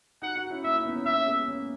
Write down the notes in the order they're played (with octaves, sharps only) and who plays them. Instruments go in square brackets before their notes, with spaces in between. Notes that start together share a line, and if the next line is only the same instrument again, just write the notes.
[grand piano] D#4 F#4 [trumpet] F#5
[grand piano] D#4 F#4
C#4 E4
[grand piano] A#3 C#4 [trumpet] E5
[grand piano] C#4 E4
B3 D#4
A#3 C#4
[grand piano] A#3 C#4 [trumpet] E5
[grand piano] C#4
G#3 B3
A#3 C#4